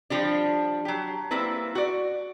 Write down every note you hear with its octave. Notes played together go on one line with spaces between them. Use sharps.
F3 G3 D4
F#3 G4
G3 A#3 C4 E4 B4
F#4 D5